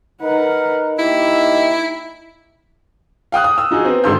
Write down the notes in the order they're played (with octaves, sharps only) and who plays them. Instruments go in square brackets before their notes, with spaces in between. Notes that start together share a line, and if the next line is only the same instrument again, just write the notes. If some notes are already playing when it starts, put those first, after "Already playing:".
[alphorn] D#4 [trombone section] A#4 [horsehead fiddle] B4 F#5
[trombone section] A#3 G4 [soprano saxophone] E4 [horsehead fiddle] E5
[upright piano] F5 G5 D#6 F#6
D#6
E6
F3 D#4 F#4 G#4
B3 C4
G#1 G#2 D3 C6 E6 G6